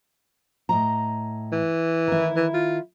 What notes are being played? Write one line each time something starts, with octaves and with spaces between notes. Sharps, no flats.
A2 D#5 A#5
E3
D#3 E4
E3
F4